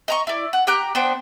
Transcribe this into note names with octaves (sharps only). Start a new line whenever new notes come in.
D#5 A#5 C#6
E4 D5
F#5
G4 G5 A#5 F#6
B3 D4 C5 G5